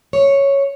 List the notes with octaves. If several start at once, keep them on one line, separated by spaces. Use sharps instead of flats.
C#5